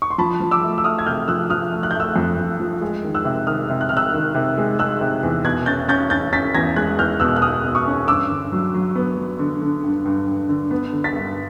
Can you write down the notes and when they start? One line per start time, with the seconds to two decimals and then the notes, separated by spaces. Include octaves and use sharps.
0.02 C#6
0.10 C6
0.18 F3 A5 B5
0.40 F3
0.51 D6 E6
0.63 A3
0.78 E6
0.84 A3 D#6 F6
0.99 G#6
1.06 C3 F6 G6
1.28 F3 E6 F#6
1.50 F3 D#6 F6
1.72 A3
1.83 F#6
1.91 G6
1.94 A3
2.00 E6 F#6
2.16 F2
2.38 F2
2.60 F3
2.81 G#3
3.04 D#3
3.15 E6 F#6
3.25 C3
3.47 D#3 D#6 F6
3.70 C3
3.81 F#6
3.89 C3 F6
3.97 E6 F#6
4.14 D#3
4.35 C3
4.58 G#3
4.79 G#3 E6 F#6
5.01 C3
5.23 E2
5.45 B2 F#6 G#6
5.66 C#4 G6 A6
5.88 C#4 G6 A6
6.10 C#4 G6 A6
6.33 C#4 A6 B6
6.54 E2 G#6 A#6
6.76 G#3 F#6 G#6
6.99 E2 F6 G6
7.20 B2 E6 F#6
7.36 F#6
7.42 G#3 D#6 F6
7.65 B2
7.75 C#6 D#6
7.86 C#4
8.08 G2 D6 E6
8.30 D3
8.52 F#3
8.74 F#3
8.96 B3
9.18 F#3
9.39 D3
9.62 D3
9.84 G2
10.05 G2
10.27 G2
10.49 D3
10.71 B3
10.93 D3
11.04 A6 B6
11.15 G2